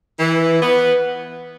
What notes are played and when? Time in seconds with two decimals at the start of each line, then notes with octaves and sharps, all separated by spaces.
0.19 E3
0.62 B3